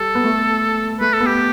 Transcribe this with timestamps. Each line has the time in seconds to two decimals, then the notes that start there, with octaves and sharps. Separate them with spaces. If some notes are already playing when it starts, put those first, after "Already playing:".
Already playing: G3 A4
0.15 B3
0.24 A3
1.00 A3 B4
1.14 A4
1.20 B3
1.26 G4